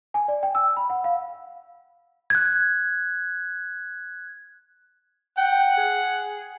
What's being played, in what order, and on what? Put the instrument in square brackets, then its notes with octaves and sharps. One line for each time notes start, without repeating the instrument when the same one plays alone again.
[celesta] G#5
D5
G5
E6
B5
F#5
F5
[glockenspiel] F#6 G#6
[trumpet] F#5 [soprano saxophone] G5
[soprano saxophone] G#4